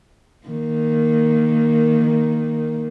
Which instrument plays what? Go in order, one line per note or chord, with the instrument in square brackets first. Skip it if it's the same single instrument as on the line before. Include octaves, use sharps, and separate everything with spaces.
[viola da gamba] D#3 A#3